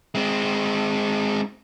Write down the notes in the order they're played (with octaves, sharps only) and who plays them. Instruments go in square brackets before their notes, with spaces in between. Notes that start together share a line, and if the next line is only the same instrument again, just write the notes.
[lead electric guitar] G#3 C4